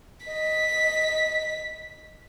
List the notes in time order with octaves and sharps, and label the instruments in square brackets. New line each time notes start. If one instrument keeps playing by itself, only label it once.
[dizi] D#5 [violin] B6